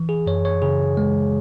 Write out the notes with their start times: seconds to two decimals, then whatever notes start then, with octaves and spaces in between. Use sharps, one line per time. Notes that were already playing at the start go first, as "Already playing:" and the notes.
Already playing: E3
0.09 G#4
0.26 F#2 C#5
0.45 C#5
0.62 C#3 G#4
0.97 G#3